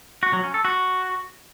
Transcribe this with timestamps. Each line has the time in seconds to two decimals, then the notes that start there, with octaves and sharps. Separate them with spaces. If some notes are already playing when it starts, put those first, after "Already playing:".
0.23 F#4
0.33 F#3
0.44 C#4
0.54 A4
0.65 F#4